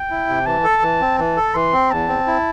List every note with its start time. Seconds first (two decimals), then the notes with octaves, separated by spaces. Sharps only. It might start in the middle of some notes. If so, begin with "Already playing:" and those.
Already playing: G5
0.10 E4
0.28 C3
0.46 E3 A5
0.64 A4
0.82 E3
1.01 C4
1.18 E3 A5
1.37 A4
1.54 E3 C6
1.73 C4
1.91 E2 A5
2.09 C4
2.27 E4